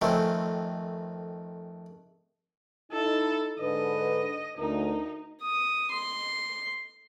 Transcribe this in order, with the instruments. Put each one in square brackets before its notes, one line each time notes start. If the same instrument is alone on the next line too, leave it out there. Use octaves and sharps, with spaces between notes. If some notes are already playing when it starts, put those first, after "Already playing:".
[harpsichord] F2 D#3 A3 C4 C#4
[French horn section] D#4 E4 [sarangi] A4
[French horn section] G#2 D3 B4 [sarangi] D#5
[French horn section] D2 A#4 [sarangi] D#4
[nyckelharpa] D#6
C6